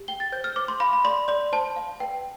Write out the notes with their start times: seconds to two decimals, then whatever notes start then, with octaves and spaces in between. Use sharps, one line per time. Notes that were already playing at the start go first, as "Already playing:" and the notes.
Already playing: G4
0.08 G5 G7
0.20 A6
0.32 C5 G6
0.44 F6
0.56 C5 D6
0.68 C6
0.80 F5 B5
0.93 B5
1.04 D5 C6
1.28 D5 C6
1.53 C5 A5
1.76 F5
2.00 B4 G5